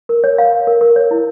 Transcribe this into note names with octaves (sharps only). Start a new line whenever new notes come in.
A#4
C#5
F5
F5
A#4
A#4
C#5
E4